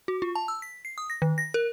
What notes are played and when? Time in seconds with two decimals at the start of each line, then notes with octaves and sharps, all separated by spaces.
0.08 F#4
0.22 F4
0.35 A5
0.48 E6
0.62 B6
0.85 C7
0.98 D#6
1.10 A#6
1.22 D#3
1.38 A#6
1.54 A#4